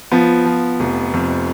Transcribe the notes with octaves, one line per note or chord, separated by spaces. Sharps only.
F3 B3
F3
F1
F2